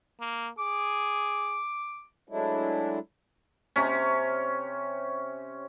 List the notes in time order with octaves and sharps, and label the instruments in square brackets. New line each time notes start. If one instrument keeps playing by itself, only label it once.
[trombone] A#3
[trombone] G#4 [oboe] D6
[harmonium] F#3 G#3 A3 D4 E4
[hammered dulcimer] C3 C#4